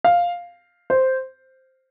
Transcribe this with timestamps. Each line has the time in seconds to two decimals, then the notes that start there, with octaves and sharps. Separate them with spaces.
0.04 F5
0.90 C5